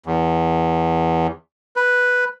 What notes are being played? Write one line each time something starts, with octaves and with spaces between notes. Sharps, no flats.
E2
B4